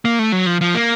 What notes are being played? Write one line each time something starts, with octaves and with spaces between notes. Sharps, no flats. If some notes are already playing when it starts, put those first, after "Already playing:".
A#3
A3
F#3
F3
F3
A#3